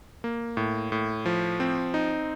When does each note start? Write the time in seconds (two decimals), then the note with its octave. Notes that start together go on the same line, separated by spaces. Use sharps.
0.24 A#3
0.57 A2
0.92 A2
1.26 F3
1.60 C4
1.94 D#4